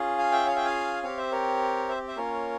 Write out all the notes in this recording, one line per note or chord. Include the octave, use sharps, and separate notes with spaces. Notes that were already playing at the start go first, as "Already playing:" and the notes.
Already playing: C#4 F4 G#4
F5 G#5
E5 G5
C#5 F5
E5 G5
F5 G#5
C4 G4 C#5 F5
C5 E5
A#4 C#5
C5 E5
C5 E5
A#3 C#4 F4 A#4 C#5